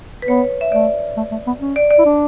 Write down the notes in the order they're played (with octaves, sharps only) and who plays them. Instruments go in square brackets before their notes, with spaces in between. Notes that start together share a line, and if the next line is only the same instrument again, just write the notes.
[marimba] B4
[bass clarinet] B3 [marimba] C#5
[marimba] E5
[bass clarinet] A3 [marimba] D5
[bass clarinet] A3
A3
B3
C#4
[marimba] D5
D5
[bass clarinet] E4
D4